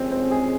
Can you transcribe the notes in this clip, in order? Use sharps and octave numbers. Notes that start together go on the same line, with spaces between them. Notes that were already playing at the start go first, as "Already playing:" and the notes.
Already playing: F2 C3 D#3 G#3 C4 C#4
C4
G#4